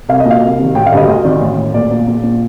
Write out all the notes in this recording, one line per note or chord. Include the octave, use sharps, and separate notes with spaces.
C2 F5
D#5
A#2
F5
C2
C3 D#3
A1 G5
F5
G2 D3 D#5
D2 D#5
C3 D#3 D5
A1
A2
A#1 D5
A#2
A#1
A#2